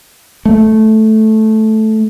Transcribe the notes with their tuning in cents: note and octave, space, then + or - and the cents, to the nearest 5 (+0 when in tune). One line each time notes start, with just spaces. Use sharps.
A3 -10